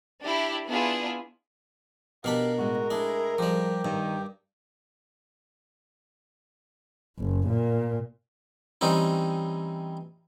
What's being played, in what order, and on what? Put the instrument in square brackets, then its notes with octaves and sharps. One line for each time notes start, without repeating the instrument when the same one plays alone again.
[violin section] D4 E4 G4
B3 D4 E4 F4 G#4
[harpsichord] B2 D4 B5 [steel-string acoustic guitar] G4 [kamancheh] A#4 [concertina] F5
[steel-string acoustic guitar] A2 G#3 [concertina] F#4
[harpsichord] D4 [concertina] E4 G#4
[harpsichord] F3 G3 [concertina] G4
[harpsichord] G2 [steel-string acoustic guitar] D#3 D#4
[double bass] F#1
A#2
[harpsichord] E3 G3 C4 C#4 D#4